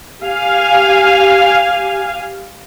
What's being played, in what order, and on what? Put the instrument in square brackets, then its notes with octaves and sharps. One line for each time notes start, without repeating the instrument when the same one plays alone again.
[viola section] G4 F5 G#5